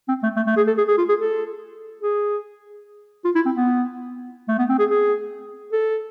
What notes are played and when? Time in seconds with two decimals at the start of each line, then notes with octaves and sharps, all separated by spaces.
0.09 C4
0.23 A3
0.36 A3
0.47 A3
0.57 G#4
0.67 A4
0.78 G#4
0.88 G#4
0.98 F4
1.09 G#4
1.19 A4
2.01 G#4
3.25 F4
3.35 E4
3.46 C4
3.56 B3
4.48 A3
4.59 B3
4.69 C4
4.79 G#4
4.90 G#4
5.72 A4